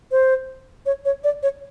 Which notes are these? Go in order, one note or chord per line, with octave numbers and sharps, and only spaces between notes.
C5
C#5
C#5
D5
C#5